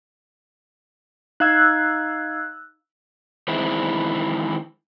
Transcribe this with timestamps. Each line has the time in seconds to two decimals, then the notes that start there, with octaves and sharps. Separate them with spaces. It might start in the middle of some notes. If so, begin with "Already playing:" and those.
1.40 D#4 F5 E6 F#6 G#6
3.48 D#3 E3 G#3 C4 E4